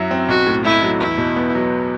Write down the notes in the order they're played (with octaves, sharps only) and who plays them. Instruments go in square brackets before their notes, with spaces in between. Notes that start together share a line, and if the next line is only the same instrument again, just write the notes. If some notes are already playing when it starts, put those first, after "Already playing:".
Already playing: [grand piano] F#2 F#3 E4
C4
[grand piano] B1 [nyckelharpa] F#4
[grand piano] A2
[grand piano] A3 [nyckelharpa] E4
[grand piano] F#3
[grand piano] E2 [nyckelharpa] E4
[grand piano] B2
B3
F#3